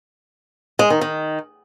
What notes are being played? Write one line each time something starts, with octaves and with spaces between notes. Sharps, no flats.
G#3
D#3
D#3